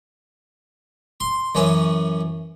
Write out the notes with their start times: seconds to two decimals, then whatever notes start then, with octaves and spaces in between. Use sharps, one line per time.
1.20 C6
1.55 F#2 E3 C#4